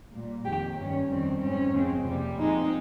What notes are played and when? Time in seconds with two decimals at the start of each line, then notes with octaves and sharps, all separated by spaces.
0.12 A#2 G3 A#3
0.44 F2 D#3 A#3 G4
0.76 G2 D#3 G3 C#4
1.09 F2 D#3 G3 C4
1.41 G#2 G3 C4 C#4
1.73 F2 C#3 G#3 C4
2.05 F2 C3 G3 A#3
2.38 A#2 F3 G#3 C4 D#4